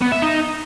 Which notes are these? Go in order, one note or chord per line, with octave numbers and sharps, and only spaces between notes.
B3
E5
D#4